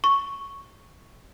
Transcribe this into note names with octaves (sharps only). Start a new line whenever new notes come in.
C#6